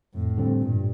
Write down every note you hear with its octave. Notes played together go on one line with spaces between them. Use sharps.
F2 A2
D3 G3 C4
G2 A#2